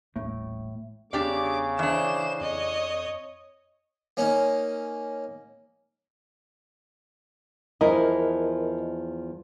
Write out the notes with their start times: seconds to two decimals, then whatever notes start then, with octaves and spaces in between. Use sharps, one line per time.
0.16 D#1 A1 A2
1.13 E2 C#3 D4 G4 D5 D6
1.79 E3 D4 C5 E7
2.41 F2 C#5 D#5
4.17 A#3 C#4 D#4
7.81 E2 F3 E4 A#4 D#5